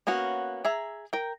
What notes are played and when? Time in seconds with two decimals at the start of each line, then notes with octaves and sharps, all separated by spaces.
0.07 A#3 B3 C#4 F#4
0.65 G#4 E5 A#5
1.13 A#4 G5